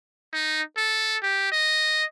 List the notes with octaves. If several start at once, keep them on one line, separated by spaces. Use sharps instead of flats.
D#4
A4
G4
D#5